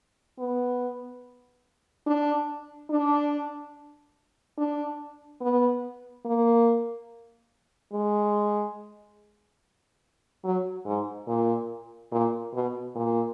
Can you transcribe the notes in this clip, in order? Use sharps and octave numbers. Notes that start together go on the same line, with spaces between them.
B3
D4
D4
D4
B3
A#3
G#3
F#3
G#2
A#2
A#2
B2
A#2